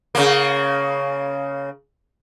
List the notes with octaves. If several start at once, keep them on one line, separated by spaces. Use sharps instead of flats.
C#3 A#3